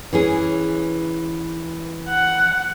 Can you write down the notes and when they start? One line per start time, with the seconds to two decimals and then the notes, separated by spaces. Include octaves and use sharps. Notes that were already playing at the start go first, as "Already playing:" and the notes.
0.13 E3 C#4 G#4
2.09 F#5